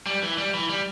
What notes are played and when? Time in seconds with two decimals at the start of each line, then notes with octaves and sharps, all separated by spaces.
0.07 G3
0.23 E3
0.38 G3
0.54 E3
0.69 G3